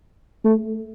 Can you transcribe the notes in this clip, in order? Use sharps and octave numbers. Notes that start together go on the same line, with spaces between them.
A3